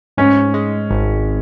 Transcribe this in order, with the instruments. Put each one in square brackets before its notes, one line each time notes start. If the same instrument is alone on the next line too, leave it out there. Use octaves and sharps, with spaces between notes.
[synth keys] G#2 [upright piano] C#4
[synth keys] G#3
G#1